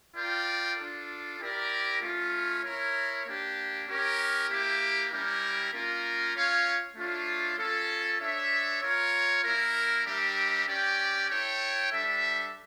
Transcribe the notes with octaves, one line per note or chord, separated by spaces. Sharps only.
F4 A#4 D5 G5
D4 F4 A4
E4 G4 A#4 D5
A3 C#4 F4
E4 A#4 C#5
A#3 D4 G4
C#4 G4 A#4 C#5
A#3 E4 G4
G3 C#4 E4 G4 A#4
A#3 C#4 F4 A#4
C#4 F4 C#5 F5
A3 D4 F4 C#5
C#4 F4 A4
D4 A4 C#5 E5
F4 A#4 C#5
A#3 E4 A#4
G3 D4 G4 A#4 E5
C#4 G4 D5 G5
E4 A4 C#5 G5
G3 D4 A4 E5